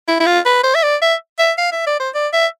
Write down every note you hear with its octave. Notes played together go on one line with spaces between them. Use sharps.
E4
E4
F4
B4
C5
E5
D5
E5
E5
F5
E5
D5
C5
D5
E5